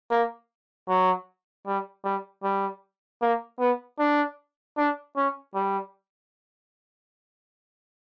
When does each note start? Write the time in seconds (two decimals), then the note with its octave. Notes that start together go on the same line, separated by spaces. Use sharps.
0.11 A#3
0.88 F#3
1.66 G3
2.05 G3
2.43 G3
3.22 A#3
3.60 B3
3.99 D4
4.77 D4
5.17 C#4
5.54 G3